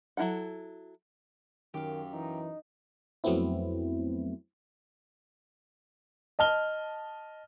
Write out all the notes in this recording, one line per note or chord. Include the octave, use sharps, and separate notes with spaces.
F#3 D#4 E4 A4 F#5
F#2 D#3 G4 F5
E3 D#4
F2 F#3 A3 B3 C4 E4
D#5 A5 F6 G7